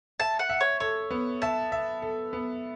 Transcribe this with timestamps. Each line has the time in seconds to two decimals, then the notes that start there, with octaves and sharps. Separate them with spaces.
0.20 E5 A5
0.39 F#5
0.49 E5
0.60 C#5
0.80 A4 C#5
1.11 B3
1.42 E5 A5
1.72 E5
2.02 A4
2.33 B3